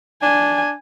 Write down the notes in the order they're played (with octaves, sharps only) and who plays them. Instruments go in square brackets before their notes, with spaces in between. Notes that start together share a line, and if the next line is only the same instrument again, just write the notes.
[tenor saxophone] D4 [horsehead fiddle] G#5